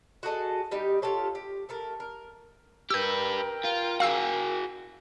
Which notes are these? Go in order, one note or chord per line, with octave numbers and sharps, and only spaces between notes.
F#4 G#4 A4 D#5
G3 D#4 G4
F4 G4 A4 C#5
G4
A3 A4 A#4
A#4
G4 A#4 B4 G5 E6 G6
F4
F#4 G#4 F5 E6 C7